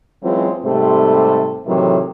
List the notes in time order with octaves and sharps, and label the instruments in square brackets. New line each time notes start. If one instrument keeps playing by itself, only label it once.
[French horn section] E3 F#3 G#3 C4 C#4 F4
G#2 C3 G3 A3 A4 C5
A2 C3 D#3 E3 F#3